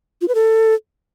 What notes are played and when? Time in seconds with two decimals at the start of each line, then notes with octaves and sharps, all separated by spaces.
0.21 F4
0.28 B4
0.35 A4